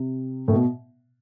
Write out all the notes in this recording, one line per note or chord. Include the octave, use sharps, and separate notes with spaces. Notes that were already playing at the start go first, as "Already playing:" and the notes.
Already playing: C3
A2
B2